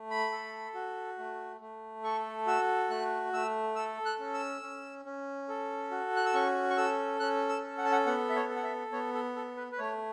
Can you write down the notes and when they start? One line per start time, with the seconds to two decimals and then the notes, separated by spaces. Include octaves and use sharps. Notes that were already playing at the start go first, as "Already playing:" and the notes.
Already playing: A3
0.10 B5
0.32 A4
0.74 F#4
1.19 A3
1.61 A3
2.03 A4 C#6
2.47 F#4 E6
2.90 A3 F#6
3.33 A3 E6
3.76 A4 E6
4.05 F#6
4.19 C#4
4.34 E6
4.62 C#4
5.05 C#4
5.49 A4
5.91 F#4
6.16 F#6
6.26 E6
6.34 C#4 C#6
6.70 C#6
6.77 A4 E6
7.20 C#4 F#6
7.49 E6
7.64 A4
7.78 F#5
7.85 A5
7.92 F#5
8.06 B3 F#5
8.30 E5
8.36 C#5
8.49 A4
8.56 F#5
8.64 E5
8.92 B3 C#5
9.14 A4
9.36 A4
9.57 B4
9.72 B4
9.78 A3 C#5